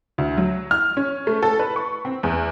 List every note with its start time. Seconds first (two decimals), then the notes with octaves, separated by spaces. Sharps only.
0.18 D2
0.37 F#3
0.71 F6
0.97 C#4
1.27 A3
1.43 A4
1.59 B4
1.76 C#6
2.05 C4
2.23 E2